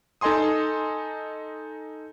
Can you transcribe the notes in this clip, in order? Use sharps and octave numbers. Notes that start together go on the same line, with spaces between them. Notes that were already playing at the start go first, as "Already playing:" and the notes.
D#4 A4 D#5 G#5 C6 D#6